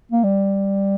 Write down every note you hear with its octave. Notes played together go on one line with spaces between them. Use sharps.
A#3
G3